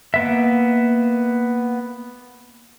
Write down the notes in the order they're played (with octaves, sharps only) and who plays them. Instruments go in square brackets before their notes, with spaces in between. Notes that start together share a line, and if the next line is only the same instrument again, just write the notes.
[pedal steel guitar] A#3 B3 E5